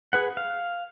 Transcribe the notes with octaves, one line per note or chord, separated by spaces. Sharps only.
G#4 B4 F#5
F5